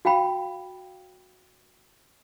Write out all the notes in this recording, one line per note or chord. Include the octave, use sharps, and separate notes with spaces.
F#4 F5 G5 B5